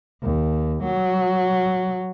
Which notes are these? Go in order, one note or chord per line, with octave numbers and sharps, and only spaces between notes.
D#2
F#3